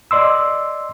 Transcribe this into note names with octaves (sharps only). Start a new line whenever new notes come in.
D5 D#5 C6 E6